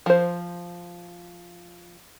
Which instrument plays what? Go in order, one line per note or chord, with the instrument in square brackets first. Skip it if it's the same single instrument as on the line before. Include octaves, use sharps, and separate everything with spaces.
[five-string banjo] F3 C5